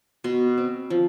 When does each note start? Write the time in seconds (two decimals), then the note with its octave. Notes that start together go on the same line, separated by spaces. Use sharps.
0.24 B2 C6
0.58 C4
0.90 F3